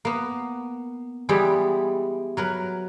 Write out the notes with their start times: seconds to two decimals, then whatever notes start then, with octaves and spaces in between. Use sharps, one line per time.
0.05 A#3 B3
1.29 E3 G3 G#3 B3 E4 G4
2.37 F#3 A#4 B4